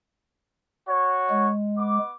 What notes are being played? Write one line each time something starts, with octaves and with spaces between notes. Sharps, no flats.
F#4 C#5
G#3
B3 D6